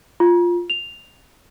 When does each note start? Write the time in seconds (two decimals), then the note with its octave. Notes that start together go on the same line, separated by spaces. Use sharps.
0.20 F4
0.70 F7